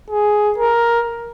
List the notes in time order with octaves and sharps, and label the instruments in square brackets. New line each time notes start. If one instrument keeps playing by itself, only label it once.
[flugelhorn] G#4
A#4